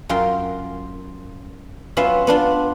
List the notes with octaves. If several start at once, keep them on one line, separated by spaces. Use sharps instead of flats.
F#2 F4 A#4 F5 G5 C6
F#3 B3 C#4 F4 E5 F5
B3 D4 F4